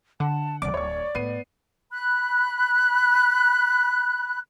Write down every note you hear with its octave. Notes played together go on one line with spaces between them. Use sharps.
D3 F#5 A5
C2 E3 D5 D6
D1 C#5 C#6
A2 B3 C7 D#7
B5 F#6